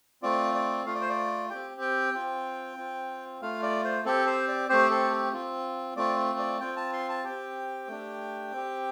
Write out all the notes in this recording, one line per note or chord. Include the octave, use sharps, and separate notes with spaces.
A3 C4 F4 D5
D5
A3 F4 F5
D5
C5
D5
C4 G4 G5
G5
C4 F4
C4 F4
A3 F4 F5
D5
C5
C4 G4 A4
C5
D5
A3 C4 G4 C5
A4
C4 F4
A3 C4 F4 D5
D5
C4 F4 G5
A5
C6
A5
C4 G4 G5
A3 D4 G4
C4 G4